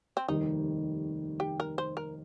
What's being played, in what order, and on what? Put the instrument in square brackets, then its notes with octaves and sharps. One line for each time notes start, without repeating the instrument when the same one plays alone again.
[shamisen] C4
[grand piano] F1 D#2 D#3 G3 [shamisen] D#4
[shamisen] G4
A#4
C5
A#4